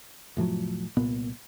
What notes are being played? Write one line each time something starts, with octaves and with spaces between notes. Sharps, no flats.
F1 A2 F3 F#3
C2 A#2 B3